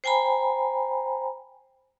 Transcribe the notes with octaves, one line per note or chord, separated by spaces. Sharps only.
C5 G5 G#5 A#5 B5